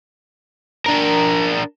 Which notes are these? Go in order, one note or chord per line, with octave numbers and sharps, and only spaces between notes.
D4 A#4